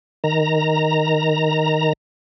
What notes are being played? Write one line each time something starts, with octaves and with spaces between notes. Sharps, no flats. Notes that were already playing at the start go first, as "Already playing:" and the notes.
D#3 A#5